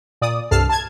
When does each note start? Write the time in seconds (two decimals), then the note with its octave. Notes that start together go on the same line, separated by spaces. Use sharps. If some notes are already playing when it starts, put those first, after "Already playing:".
0.22 A#2 D5 D#6
0.51 C2 G2 A4 A5 F6 C7
0.69 A5 G#6